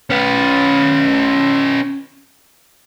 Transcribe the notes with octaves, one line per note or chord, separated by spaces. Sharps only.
C#4 B4